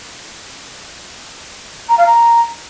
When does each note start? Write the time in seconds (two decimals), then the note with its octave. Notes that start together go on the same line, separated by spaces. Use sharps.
1.89 A#5
1.98 F5
2.07 A#5